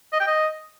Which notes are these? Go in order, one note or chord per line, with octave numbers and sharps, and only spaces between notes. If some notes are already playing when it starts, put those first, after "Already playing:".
D#5
G5
D#5